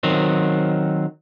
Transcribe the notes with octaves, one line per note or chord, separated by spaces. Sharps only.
D#3 F#3 C4